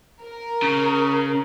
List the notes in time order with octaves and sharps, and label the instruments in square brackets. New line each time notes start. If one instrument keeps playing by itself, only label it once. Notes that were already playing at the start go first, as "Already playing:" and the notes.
[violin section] A#4
[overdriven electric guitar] C#3